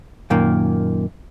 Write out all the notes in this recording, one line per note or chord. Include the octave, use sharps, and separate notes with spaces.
F#2 A#2 D#3 A#3